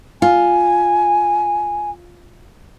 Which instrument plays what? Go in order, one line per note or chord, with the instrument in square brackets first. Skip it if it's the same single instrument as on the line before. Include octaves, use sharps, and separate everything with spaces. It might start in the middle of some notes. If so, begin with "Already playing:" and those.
[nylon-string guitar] F4 [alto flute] G#5